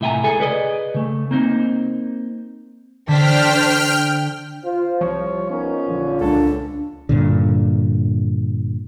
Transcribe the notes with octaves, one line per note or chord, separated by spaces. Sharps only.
A2 C3 E5 G5 G#5 A#5
C#2 G#4 A4 G#5
G#4 B4 D5 D#5
C#3 A3
A#3 C4 D#4
D3 D4 C5 G5 F6 B6
F4 C5
C2 F3 C#5
B3 C#4 D#4 A#4
A#1 D3 F4
C#2 D4 A4
G2 A#2 D3